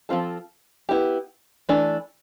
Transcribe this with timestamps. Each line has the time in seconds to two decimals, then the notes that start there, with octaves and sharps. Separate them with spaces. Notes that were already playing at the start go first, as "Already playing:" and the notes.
0.09 F3 C4 F4 A4
0.89 B3 E4 G4
1.69 E3 A3 D4